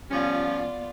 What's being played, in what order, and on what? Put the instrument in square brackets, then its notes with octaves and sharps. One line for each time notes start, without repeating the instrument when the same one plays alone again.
[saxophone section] F3 G3 C#4 [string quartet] B3 F4 D5